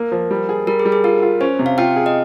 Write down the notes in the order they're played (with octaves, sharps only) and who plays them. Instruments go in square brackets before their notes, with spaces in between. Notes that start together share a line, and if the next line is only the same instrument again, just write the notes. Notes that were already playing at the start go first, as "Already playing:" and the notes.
Already playing: [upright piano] A#3 [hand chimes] A#4
[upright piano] F3
G3
G#4
[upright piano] G3 [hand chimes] A#4
[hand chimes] G#4
[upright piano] G3
[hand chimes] G#4
[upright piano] F4 [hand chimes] A#4
[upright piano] F4
[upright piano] C#4 [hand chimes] C5
[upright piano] C3
[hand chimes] F5
[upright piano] F4 [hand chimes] G5
[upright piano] G#4
[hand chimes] D#5